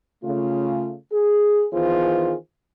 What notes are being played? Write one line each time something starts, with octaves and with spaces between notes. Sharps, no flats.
C#3 A3 F4
G#4
D#3 E3 B3 F4 G#4 C5